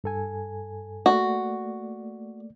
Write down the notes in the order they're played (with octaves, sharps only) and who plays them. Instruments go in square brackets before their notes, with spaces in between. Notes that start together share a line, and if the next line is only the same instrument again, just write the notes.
[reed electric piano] G2 A4 G#5
[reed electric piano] A3 A#3 D5 [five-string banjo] F#4